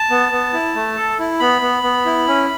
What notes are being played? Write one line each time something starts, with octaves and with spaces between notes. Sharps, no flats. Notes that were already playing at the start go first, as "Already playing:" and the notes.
Already playing: A5
B3
B3
E4
A3
A4
E4
B3 B5
B3
B3
E4
C#4